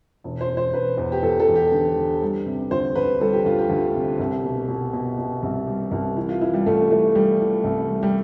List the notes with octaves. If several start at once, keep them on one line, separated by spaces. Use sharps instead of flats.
E1
C5
E1
C5
E1 B4
E2
G4
E2 A4
A4
E2
G4
D3
D3
G3
C3
D2 C5
D2 B4
G3 A4
G4
D2 F4
G4
D2
C3
C2
B2
B2
B2
B2
C2
G3
C2
E3 E4
F4
E3 E4
G3
C2 A3
E3 A3
G3
E3
C2
G3
G3